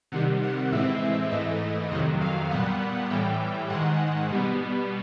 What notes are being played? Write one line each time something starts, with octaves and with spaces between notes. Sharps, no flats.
C3 D#3 G3 F#5
F#5
A2 E3 G#3 C4 E5
G#2 E3 A3 D#5
F2 C3 D#3 F#3 D#5
F5
A#2 G3 B3 F#5
A2 E3 G3 G5
G#2 D#3 G#3 F#5
B2 G3 B3